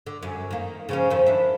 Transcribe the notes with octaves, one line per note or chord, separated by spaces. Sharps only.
D3
F#2
D#3 A#3
C#3 F3 C#4
F2 D#3
D4 E4